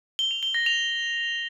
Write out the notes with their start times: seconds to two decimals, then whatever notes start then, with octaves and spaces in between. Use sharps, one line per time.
0.19 G7
0.31 F7
0.43 G7
0.54 A#6
0.66 F7